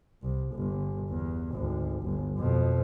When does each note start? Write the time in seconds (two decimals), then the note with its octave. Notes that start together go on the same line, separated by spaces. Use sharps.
0.22 C2
0.54 G1
1.10 E2
1.52 G#1 D2
2.03 G1
2.38 F2 B2